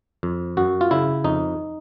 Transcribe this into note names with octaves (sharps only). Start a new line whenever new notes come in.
F2
F#2 F#4
F4
C#3 E4
F2 D#4